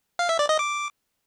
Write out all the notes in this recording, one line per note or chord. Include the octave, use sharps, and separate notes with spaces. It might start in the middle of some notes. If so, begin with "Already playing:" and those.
F5
E5
D5
D#5
D6